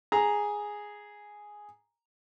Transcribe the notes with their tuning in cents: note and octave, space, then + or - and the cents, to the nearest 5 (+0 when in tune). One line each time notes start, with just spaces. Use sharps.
G#4 +0 A#5 +0